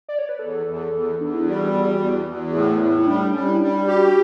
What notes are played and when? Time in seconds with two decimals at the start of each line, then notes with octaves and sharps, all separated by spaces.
0.09 D5
0.19 C#5
0.29 B4
0.39 E2 A4
0.66 E2
0.93 E2
1.19 E2 D4
1.34 E4
1.46 G3 F#4
1.73 E2
1.99 E2
2.26 E2
2.53 A2 E4
2.80 A2
2.99 E4
3.07 G3 D4
3.33 G3 C#4
3.48 E4
3.60 G3 D4
3.87 F#4 G4